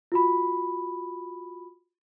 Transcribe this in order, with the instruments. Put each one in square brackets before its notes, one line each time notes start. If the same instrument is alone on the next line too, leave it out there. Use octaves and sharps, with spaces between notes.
[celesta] F4 F#4 B5